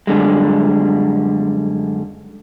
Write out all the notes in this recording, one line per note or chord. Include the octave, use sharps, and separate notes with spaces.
F#2 D3 G3 G#3